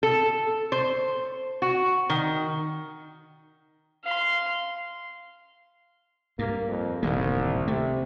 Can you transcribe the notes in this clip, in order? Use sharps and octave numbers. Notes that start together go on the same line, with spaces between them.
A4
C5
F#4
D#3
F5 C6
G2 A#3
F2
D1 C2 D#3 A#3
C3 A3